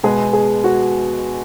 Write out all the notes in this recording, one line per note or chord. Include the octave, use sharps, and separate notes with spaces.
B2 G#3 B3 G#4
G#4
F#4